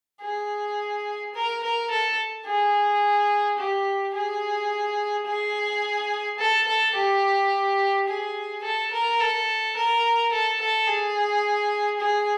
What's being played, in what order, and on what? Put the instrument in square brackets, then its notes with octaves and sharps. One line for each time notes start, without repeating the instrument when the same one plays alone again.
[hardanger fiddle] G#4
A#4
A#4
A4
G#4
G4
G#4
G#4
A4
A4
G4
G#4
A4
A#4
A4
A#4
A4
A4
G#4
G#4